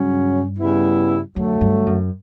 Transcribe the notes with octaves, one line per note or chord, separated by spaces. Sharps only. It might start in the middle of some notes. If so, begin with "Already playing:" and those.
Already playing: G2 C#3 F#3 C#4
C#3 G3 B3 E4
F#2 D3 F#3 A3
G2
F#2